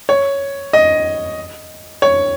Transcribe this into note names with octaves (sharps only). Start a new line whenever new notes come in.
C#5
D#5
C#5